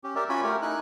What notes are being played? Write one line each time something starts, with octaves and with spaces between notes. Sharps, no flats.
C#4 G4
G4 A#4 D5 E5
C#4 F4 F#4 G#5 B5
A3 G4 A#4
D#4 E4 G#5 F#6